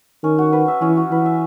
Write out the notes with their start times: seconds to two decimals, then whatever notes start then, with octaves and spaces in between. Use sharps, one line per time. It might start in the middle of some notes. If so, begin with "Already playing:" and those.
0.23 D#3 C#4
0.39 F#4
0.53 B4
0.68 E5
0.81 E3 C#4
0.97 F#4
1.11 E3 B4
1.26 E5